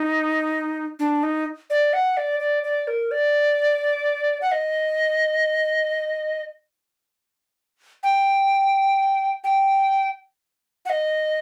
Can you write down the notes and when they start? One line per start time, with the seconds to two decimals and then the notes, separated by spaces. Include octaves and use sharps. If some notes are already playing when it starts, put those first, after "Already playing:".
Already playing: D#4
0.99 D4
1.23 D#4
1.70 D5
1.93 F#5
2.17 D5
2.40 D5
2.63 D5
2.87 A#4
3.11 D5
4.41 F#5
4.52 D#5
8.03 G5
9.44 G5
10.86 F#5
10.90 D#5